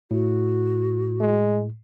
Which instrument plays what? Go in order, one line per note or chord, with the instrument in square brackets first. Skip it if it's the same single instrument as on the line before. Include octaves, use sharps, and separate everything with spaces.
[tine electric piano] A2 [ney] F#4
[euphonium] G#3